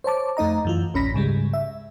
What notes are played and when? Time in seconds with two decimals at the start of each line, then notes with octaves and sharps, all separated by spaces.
0.04 C5 C#5 A5 D6
0.37 F2 A3 D#4 D#5 A#5
0.65 F#2 E3 F4
0.94 A1 D2 C#4 B5 A#6 B6
1.14 G#2 C#3 G3 G#3
1.53 E5